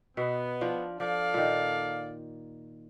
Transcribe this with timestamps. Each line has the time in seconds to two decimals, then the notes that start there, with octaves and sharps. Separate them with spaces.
0.17 B2 B3 E5
0.61 F3 D4 F4
1.00 F3 A4 D5 F5
1.34 A#2 D#3